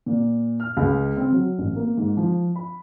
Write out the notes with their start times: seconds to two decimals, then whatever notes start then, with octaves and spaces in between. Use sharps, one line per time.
0.06 A#2
0.60 F6
0.77 C#2
1.17 C4
1.32 F#3
1.58 A1
1.76 A#3
1.97 G#2
2.17 F3
2.56 B5